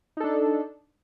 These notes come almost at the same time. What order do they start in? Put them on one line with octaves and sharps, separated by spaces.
D#4 A4 D4